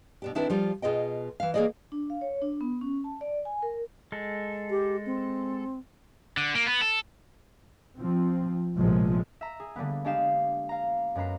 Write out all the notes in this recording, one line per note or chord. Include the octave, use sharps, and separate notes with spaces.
B2 D4 G4
D#3 C4 D4 E4 A4 B4
F3 G3 F4
B2 F4 G#4 D#5 G5
E3 F5
E3 A#3 B3 G#4 D5 D#5
D4
F5
C#5
D4
B3
C#4
A5
D5
G#5
A#4
G#3 A4
G4
C4
D3
A#3
B3
A4
F3 C4
A#1 A2 C3 F3 G#3
E5 A#5
G#4
D3 G3 A#3 B3
G#3 D4 G4 F5 E7
F5 A#5
F#2 G#3 B4 A#5 C7